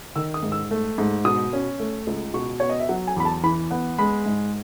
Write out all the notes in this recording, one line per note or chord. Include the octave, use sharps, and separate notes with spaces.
D#3 E6
D#6
G#2
E6
A3
G#2
B2 D#6
C#4
A3
C#2
B2 C#6
B3 C#5
D#5
E5
F#3 F#5
G#5
E2 B5
A5
E3 B5
B3
G#3 B5
G#2